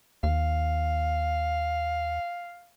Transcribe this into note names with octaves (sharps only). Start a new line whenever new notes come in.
D#2 F5